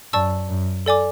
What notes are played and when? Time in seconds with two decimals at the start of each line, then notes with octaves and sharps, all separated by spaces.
0.13 F#2 D5 A5 C#6 E6
0.49 F#2
0.86 A4 D5 G#5 D6